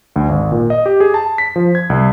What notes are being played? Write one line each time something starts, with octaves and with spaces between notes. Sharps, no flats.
D2
G#1
A#2
D#5
G4
G#4
A5
B6
F3
G#6
C2